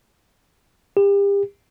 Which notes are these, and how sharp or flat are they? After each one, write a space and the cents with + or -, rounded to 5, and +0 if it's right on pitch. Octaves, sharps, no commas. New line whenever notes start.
G4 +35